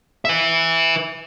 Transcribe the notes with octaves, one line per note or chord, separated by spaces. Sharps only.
B4 E5